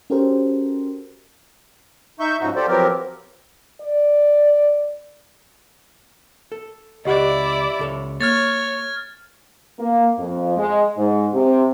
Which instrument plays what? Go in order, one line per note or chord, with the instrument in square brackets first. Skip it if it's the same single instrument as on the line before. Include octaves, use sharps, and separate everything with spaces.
[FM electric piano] C#4 F#4 G4 A4 A#4 C5
[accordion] D#4 E5 C#6 G6
G#2 C#3 F3 D#4 F#4
F4 G4 A4 C5 D5
F3 F#3 B3 C4 G4 A#4
[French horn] D5
[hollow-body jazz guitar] A4
[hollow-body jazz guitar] C#2 F#5 [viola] E4 D5 [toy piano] G4 D#5
[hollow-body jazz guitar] C#2 A4 C#5
[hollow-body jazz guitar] A#3 [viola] C#5 [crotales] F6 G#6 A6
[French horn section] A#3
F2
G#3
G#2
C3